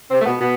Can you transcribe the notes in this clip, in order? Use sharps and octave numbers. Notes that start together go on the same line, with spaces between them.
C3 C4
A3
B2 B3
B2 B3